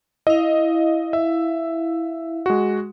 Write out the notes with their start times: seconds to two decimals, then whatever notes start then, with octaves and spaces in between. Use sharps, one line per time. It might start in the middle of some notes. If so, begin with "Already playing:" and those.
0.27 E4 D#5 F5
1.13 E5
2.46 G#3 F#4